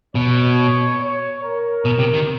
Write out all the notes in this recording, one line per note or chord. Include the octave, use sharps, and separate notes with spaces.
B2 C#5
C#5
A#4
B2
C3
D#3